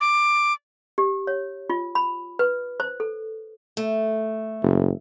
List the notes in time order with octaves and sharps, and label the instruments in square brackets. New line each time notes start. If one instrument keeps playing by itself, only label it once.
[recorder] D6
[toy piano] G4
C#5
F4
B5
B4
C5
A4
[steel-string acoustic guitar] A3
[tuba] F#1